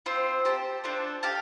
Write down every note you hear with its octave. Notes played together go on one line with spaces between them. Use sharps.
C4 F4 C5
G4 C5 A5
D4 F4 A4 C5
G4 F5 A5